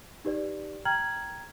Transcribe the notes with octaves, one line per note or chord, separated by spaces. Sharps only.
D#4 G4 B4 D5
G5 A#5 F6 G#6 F#7